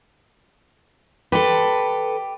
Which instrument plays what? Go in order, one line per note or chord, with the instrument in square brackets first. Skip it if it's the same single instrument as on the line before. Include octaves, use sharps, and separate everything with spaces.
[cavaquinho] G4 C6 [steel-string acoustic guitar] A4 B4